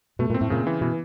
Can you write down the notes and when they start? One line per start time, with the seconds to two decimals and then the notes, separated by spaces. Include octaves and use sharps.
0.19 B2 A3
0.30 A#2 C4
0.41 A2
0.50 A#2 C#3
0.67 E3
0.81 B2 E3